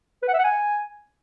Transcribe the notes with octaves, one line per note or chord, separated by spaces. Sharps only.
B4
F#5
E5
F#5
G#5